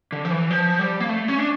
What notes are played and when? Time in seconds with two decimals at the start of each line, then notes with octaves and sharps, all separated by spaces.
0.12 D3
0.25 F3
0.31 E3
0.50 F3
0.79 G3
1.00 A#3
1.09 A3
1.28 C#4
1.39 D4